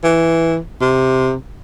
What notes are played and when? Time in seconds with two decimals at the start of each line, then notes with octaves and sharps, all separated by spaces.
0.04 E3
0.80 C3